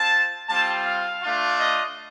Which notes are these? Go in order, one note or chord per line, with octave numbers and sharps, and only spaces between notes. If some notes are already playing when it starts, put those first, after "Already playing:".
Already playing: C4 F4 A5
G3 C4 F4 A5
F5
A3 D4 F4
D#5